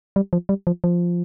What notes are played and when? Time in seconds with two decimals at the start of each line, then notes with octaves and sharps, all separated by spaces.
0.16 G3
0.33 F3
0.49 G3
0.67 F3
0.84 F3